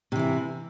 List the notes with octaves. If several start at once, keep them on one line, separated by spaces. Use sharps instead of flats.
C3 E3 E4